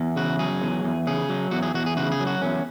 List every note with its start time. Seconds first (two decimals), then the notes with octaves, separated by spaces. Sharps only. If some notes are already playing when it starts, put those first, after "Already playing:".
Already playing: E2
0.16 C#3 F#4
0.39 F#3 G#4
0.62 E2
0.84 E2
1.07 C#3 G#4
1.29 F#3
1.51 E2 F#4
1.63 G#4
1.74 E2 F#4
1.86 G#4
1.97 C#3 F#4
2.12 G#4
2.20 F#3
2.27 F#4
2.42 E2 C#4